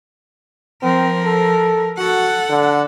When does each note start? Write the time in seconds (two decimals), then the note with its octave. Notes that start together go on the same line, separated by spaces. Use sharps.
0.82 F3 C4 A#4
1.24 A4
1.98 F#4 A4 F#5
2.49 D3